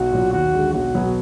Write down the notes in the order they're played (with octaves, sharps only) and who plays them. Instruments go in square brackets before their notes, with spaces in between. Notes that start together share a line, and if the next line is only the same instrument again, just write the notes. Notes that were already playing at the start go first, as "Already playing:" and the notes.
Already playing: [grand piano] B1 [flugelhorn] F#4
[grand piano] A#2 F#3
[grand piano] D#2 [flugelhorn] F#4
[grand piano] D3 G#3
[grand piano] B1 [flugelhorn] F#4
[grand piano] B2 F#3 B3